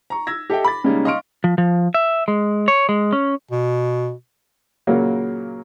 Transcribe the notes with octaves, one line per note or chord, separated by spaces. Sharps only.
A#5 C#6
E6 G#6 A#6
G4 A4 D#5 E5 G5
B5 D6 A6
C#3 G3 G#3 A#3 C#4 D#4
D#5 F5 C6 C#6 F6 D7
F3
F3
E5
G#3
C#5
G#3
C#4
B2
A#2 C#3 F#3 A#3